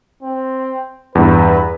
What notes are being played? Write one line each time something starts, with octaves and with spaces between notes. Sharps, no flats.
C4
E2 G2 B4